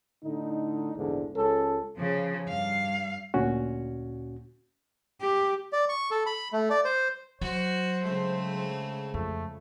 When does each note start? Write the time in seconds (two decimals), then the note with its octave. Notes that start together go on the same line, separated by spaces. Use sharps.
0.24 A2 D3 D#4
0.95 A#1 E2 G#2 D3
1.36 C#2 C#4 A4
1.97 C#3 F3
2.49 G2 F5
3.34 D2 A#2 C#4 F#4
5.21 G4
5.73 D5
5.89 C#6
6.11 A4
6.26 B5
6.53 A3
6.70 D5
6.85 C5
7.41 F#3 F#4 C5
8.03 C#3 G#3 A3 C4
9.14 F2 A3